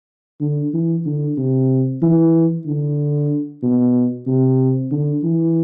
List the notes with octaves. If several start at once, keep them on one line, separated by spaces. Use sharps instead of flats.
D3
E3
D3
C3
E3
D3
B2
C3
D3
E3